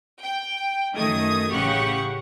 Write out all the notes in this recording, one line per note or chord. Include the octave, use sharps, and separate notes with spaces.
G5
F#2 D#3 A3 D#6 G#6
A1 C#3 G4 F#5 C#6